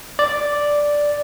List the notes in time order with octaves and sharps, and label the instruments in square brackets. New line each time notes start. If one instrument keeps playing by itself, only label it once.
[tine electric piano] D5